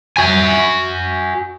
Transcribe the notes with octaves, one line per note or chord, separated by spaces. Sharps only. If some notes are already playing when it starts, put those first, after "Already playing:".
F#4 G#5